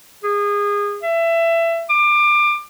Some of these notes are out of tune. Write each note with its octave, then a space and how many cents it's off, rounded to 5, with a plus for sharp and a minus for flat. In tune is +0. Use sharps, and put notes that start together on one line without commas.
G#4 -25
E5 +20
D6 +25